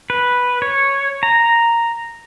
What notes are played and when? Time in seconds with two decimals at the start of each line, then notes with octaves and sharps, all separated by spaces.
0.10 B4
0.62 C#5
1.23 A#5